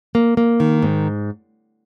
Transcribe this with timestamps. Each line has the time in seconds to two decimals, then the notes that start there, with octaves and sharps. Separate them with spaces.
0.15 A#3
0.37 A#3
0.60 D#3
0.82 G#2